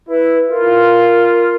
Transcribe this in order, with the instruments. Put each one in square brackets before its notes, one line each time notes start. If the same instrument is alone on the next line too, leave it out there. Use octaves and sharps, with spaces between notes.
[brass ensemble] E4 [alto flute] B4
[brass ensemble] F4 [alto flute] A#4